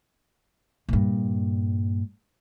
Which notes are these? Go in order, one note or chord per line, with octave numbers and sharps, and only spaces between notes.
G2 A#2